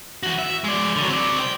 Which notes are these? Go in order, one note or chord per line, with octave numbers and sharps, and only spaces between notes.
E3 F#4
E5
G#3 D5
D3 F#3
C4 D5
G5